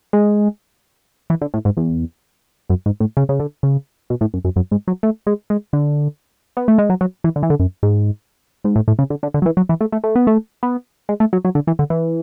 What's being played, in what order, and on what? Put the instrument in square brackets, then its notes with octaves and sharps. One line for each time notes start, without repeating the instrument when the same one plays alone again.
[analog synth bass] G#3
E3
D3
A2
G#2
E2
F#2
G#2
A2
C#3
C#3
D3
C#3
B2
A2
F#2
F#2
F#2
G#2
F#3
A3
G#3
G#3
D3
B3
A3
G#3
F#3
F#3
E3
D3
E3
D3
F#2
G#2
G#2
A2
A2
C#3
D3
D3
D3
F#3
E3
F#3
E3
A3
A3
A3
B3
A3
B3
G#3
A3
F#3
F#3
D3
E3
D3
E3